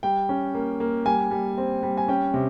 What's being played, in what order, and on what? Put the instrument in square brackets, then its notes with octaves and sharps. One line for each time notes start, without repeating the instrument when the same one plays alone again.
[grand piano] G3 G5
C#4
A#3
A#3
G3 G#5
G3
C4
G3
G#5
C#4 G5
C3